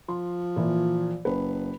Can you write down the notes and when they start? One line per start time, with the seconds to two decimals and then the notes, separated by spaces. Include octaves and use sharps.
0.09 F3 C6
0.56 A#2 E3
1.25 F#1 B4